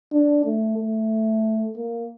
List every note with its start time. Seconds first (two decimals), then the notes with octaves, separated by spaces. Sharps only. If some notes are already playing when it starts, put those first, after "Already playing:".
0.12 D4
0.45 A3
0.78 A3
1.77 A#3